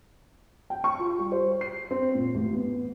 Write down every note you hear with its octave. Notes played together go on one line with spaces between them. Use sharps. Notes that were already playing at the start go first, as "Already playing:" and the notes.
G5
C#6
F4
G3
C5
C7
C4
A#2
A1
B3